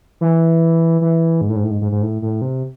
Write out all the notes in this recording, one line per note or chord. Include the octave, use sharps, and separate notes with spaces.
E3
E3
G#2
A2
G#2
A2
G#2
G#2
G#2
A2
A2
C3